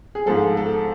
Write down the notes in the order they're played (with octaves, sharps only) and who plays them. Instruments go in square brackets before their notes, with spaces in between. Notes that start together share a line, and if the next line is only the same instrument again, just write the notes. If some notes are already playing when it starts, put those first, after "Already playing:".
[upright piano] G#4
G#2 F3 G#3 A4
A4